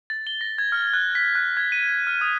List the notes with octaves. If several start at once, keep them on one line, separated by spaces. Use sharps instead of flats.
A6
G7
A#6
G#6
F6
F#6
B6
F#6
G#6
D#7
F6
D#6